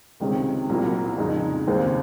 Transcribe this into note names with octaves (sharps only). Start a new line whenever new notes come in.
C#2 C3 D#3 G#3 C#4
C2 A#2 F#3 A#3 F4
F2 C#3 G#3 D#4
D#2 C#3 G#3 C4